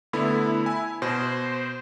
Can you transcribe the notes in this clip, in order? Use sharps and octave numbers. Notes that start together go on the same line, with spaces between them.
D3 A3 B3 E4
G#5
B2 C5